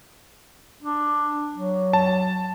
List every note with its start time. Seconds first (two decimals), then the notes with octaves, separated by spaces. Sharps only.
0.83 D4
1.55 F#3
1.93 A5